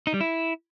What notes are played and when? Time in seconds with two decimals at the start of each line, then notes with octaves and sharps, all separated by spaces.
0.07 D#4
0.14 G3
0.21 E4